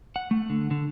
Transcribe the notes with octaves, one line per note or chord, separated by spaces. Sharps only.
F#5
A3
D3
D3